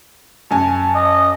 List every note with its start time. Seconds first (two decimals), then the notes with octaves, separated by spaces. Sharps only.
0.51 F#2 G#5 A5
0.95 D#5